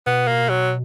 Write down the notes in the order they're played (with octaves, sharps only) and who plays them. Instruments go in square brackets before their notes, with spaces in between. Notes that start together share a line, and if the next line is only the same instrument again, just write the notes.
[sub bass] B2 [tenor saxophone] B3
[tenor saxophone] A#3
F#3